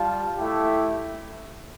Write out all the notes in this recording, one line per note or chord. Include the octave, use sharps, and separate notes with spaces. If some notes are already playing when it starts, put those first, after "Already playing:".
Already playing: G3 F4 F5 A5
A3 E4 G4